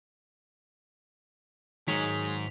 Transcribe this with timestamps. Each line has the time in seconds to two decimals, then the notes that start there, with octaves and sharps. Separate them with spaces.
1.88 G#2 D#3 F#3 G#3 G#4 B6 F7